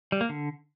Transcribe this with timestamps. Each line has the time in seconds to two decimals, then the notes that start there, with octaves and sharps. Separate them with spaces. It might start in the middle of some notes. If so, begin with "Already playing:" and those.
0.12 G3
0.21 A#3
0.29 D3